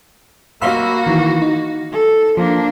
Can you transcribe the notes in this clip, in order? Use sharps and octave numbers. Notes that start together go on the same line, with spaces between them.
A#3 F#4 F5 B5 E6
D#3 E3
D#4
A4
F3 A#3 D4